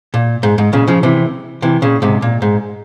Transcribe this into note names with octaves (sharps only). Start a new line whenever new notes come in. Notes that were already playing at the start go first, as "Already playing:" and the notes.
A#2
G#2
G#2
A#2 C#3
C#3 F3
C3 E3
C3 E3
A#2 C#3
G#2 C3
A#2
G#2